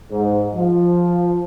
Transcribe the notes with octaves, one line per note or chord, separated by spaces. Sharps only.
G#2
F3